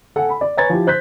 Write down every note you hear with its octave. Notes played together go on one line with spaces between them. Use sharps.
A4 F#5 G#5
B5
D5
B4 C#5 G#5 A#5 G#6 A6
F3 E4 G4
C5 F#6 G6 B6